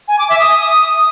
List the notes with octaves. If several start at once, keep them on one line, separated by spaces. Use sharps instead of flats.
G#5
D6
E5
D#6